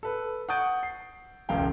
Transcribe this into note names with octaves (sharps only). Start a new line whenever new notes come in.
A4 B4
F#5 C#6 D#6 G6 A6 D7
C7
E1 C#2 F#2 C#3 F5 G5